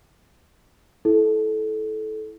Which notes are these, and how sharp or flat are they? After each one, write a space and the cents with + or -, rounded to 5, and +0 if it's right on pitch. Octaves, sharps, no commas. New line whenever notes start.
E4 +0 A4 -20